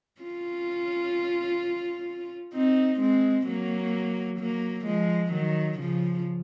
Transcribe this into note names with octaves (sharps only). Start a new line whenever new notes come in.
C#4 F4
C4 D#4
G#3 C4
F#3 A#3
F#3 A#3
F3 G#3
D#3 F#3
C#3 F3